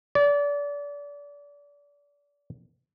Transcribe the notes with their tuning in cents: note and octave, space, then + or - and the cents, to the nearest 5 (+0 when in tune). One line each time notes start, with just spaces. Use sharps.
D5 -30